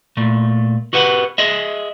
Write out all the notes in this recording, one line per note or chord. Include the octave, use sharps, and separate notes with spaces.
A#2 A3
F#4 G4 B4 F#5
G#4 D#5 E5